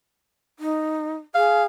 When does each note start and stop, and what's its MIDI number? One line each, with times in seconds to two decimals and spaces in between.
0.59 1.14 63
1.35 1.65 68
1.35 1.64 77